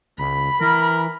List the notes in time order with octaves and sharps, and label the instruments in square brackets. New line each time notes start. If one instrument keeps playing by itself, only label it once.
[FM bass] C#2 [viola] B5
[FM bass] E3 [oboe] A#4